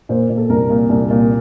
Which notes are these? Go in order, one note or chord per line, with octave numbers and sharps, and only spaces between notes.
A#2 C5
A#2
A4
C2 A#4
A#2
C2
A#2